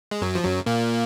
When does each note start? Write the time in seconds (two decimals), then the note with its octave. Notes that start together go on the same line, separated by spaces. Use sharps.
0.11 G#3
0.21 F#2 F#3
0.35 F3
0.44 F#2 F#3
0.66 A#2 A#3